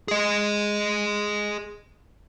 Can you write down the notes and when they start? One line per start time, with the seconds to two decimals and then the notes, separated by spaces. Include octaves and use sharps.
0.08 G#4 D#5